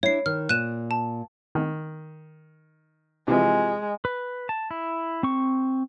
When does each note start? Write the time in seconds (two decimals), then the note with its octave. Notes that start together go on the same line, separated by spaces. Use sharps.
0.03 D4 E4 C#5 C7
0.26 D#3 F6
0.49 A#2 F#6 D#7 E7
0.91 A5
1.55 D#3
3.28 C3 E3 F3 G#3
4.05 B4
4.49 A5
4.71 E4
5.23 C4 C#6